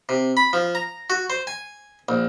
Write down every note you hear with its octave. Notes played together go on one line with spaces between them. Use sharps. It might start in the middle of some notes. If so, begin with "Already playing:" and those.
C3
B5
F3
A#5
F#4
C5
G#5
A#1